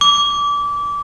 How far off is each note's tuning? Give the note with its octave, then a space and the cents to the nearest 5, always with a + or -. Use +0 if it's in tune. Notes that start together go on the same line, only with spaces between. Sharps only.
D6 -25